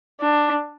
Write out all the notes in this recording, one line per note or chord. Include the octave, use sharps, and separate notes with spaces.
D4